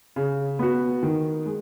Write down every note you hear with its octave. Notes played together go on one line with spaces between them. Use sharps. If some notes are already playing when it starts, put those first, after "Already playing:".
C#3
B3 F#4
D#3
G#3